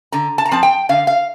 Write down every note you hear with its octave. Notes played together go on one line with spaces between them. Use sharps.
D3 A#5
A5
A#5
F3 C4 A5
G5
D3 F5
F5